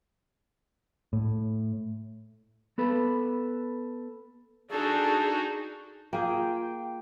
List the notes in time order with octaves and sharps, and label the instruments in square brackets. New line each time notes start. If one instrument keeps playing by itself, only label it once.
[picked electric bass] A2
[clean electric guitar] B3 A4 B4
[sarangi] D4 [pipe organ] D#4 F#4 [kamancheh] G#4 [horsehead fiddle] A4
[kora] A#3 G#4 [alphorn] F4 [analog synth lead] G5